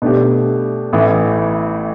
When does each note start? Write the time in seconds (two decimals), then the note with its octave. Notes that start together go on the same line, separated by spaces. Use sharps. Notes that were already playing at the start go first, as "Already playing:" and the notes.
0.02 B2 A3 D4 G4
0.93 A1 A2 E3